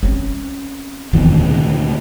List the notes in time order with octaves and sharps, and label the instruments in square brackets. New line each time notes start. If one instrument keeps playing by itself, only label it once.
[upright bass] C4 C#4
[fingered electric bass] D#1 E2 F3 [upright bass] C3 D#3
[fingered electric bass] D2 A#2 C#3